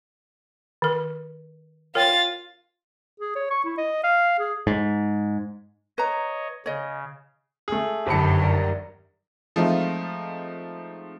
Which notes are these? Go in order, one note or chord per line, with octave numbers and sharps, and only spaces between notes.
D#3 A#4
F4 A#4 C#5 G5 A6
G#4
C#5
C#6
E4
D#5
F5
G#4
G#2
B4 C#5 D#5 A#5
C#3 C#5 D#5
A3 G#4
G1 F#2 D#3 G4 C5 A5 B5 C#7
G3 A#4
F3 G#3 A3 C4 D#4 F4